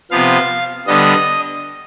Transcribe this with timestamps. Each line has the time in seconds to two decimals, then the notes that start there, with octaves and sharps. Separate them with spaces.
0.11 C3 F3 B3 F5
0.87 D3 G3 B3 D#5